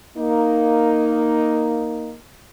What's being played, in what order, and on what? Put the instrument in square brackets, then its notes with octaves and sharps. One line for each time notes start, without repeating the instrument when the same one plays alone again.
[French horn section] A#3 D#4